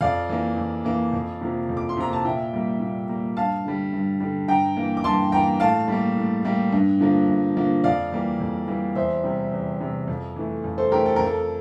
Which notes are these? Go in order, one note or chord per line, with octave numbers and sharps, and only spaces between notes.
F2 D5 F5
E3 A#3
F2
E3 A#3
F2
C3 F3 A#3
F2
D6
C6
C3 F3 A#3 A#5
A5
A#2 E5 G5
G3 A#3
A#2
G3 A#3
G2 F5 A5
D3 G3
G2
D3 G3
G2 G5 A#5
E3 A#3
D6
G2 A5 C6
E3 A#3 G5 A#5
A2 F5 A5
G3 A#3
A2
G3 A#3
G2
D3 F3 A#3
G2
D3 F3 A#3
F2 D5 F5
E3 G3 A#3
F2
E3 G3 A#3
E2 C5 E5
C3 G3
E2
C3 G3
F2
E3 A3
F2
A4 C5
E3 A3 G4 A#4
A4
F2 A#4
A4